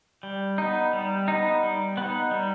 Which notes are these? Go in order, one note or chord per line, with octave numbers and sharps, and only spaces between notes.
G3
B3 D#4
G3
B3 D#4
G3
B3 D#4
G3